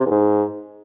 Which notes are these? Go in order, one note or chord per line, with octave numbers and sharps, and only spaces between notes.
C3
E2
G#2